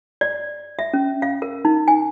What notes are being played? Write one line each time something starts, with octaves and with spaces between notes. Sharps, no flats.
D5
E5
C#4
F5
A#4
D#4
G#5